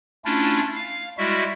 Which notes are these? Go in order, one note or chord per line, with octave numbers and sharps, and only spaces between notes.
A3 C#4 D4 E4 F4
F5
G3 G#3 E4 F#4 E5